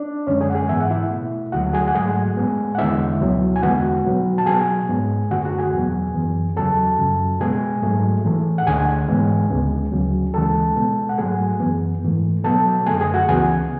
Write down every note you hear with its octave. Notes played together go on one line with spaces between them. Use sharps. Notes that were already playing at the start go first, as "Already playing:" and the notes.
Already playing: D4 D5
F#2 D3 G#3 C#4 C#5
G#4 G#5
F#5
G#4 G#5
G#2 E3 B3 E5
F#5
E4 E5
B2 A3
D2 D3 F#3 A3 F#4 F#5
G#4 G#5
F#5
G#2 F#3 A3 G#4 G#5
A2 G#3 B3
F#5
E2 D3 G#3 B3 E4 E5
C#2 B2 F#3 B3
G#5
E2 D3 G#3 B3 F#4 F#5
B2 F#3 B3
A5
B2 F#3 B3 G#4 G#5
G#2 G#3 B3
F#2 D3 A3 F#4 F#5
F#4 F#5
G#4 G#5
E2 B2 F#3 B3
F#2 E3 B3
E2 C#3 F#3 A4 A5
F#2 C#3 F#3
B2 G#3 B3 G#4 G#5
G#2 F#3 A3
A2 E3 A3
F#5
D2 D3 A3 G#4 G#5
G#2 E3 G#3 B3
D2 C#3 G#3 B3
D2 C#3 F#3
D2 C#3 E3 G#3 A4 A5
B2 G#3 B3
F#5
G#2 F#3 A3 G#4 G#5
F#2 E3 B3
G#2 E3 A3
B2 F#3 B3 A4 A5
F#2 D3 A3 G#4 G#5
G#4 G#5
F#4 F#5
C#2 C#3 E3 B3 G#4 G#5